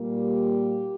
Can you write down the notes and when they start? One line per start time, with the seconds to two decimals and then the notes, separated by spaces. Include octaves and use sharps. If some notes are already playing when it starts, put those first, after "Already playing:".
Already playing: A#2 G3 A#3
0.19 G4